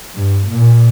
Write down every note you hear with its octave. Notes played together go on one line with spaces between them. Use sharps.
G2
A#2